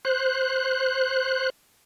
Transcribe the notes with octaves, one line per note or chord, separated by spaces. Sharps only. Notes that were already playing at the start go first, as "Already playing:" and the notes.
C5 F#6